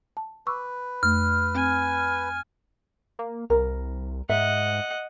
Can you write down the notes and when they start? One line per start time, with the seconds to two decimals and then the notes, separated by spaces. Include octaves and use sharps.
0.17 A5
0.47 B4 C#6 D6 E6
1.03 F2 A3 F6
1.55 C4 G#5
3.19 A#3
3.50 C2 A#4
4.29 G#2 D#5 E5 F#5